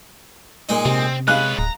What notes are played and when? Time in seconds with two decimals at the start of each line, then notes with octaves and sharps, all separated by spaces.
0.69 A#2 G#3 D#4
0.85 C3 C4
1.28 G#3 C#4 B4 F5 F#6
1.59 D1 A#5